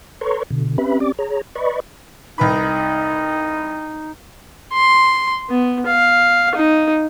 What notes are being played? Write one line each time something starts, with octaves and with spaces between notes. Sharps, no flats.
A4 B4 C#5 A#5 C6 C#6
B2 D3
C4 C#4 G4 B4 E5 B5
C4 C#4 G4 D5 D6
G#4 C#5 A#5
B4 D5 D#5 B5 C#6
C2 D#4 B4 B5
C6
B3
F5
D#4